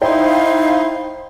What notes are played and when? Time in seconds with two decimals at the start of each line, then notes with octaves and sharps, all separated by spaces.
0.02 D#4 E4 C5 F5 G5 C6